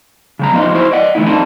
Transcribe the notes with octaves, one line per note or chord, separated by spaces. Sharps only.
C#3 G3 A#5
F3 A#3 B3 D#4 F4 D#5
E4 F#4 C5
D5 D#5 F#5
E3 A3 D#4 E4
A#3 C4 D4 D#4 A4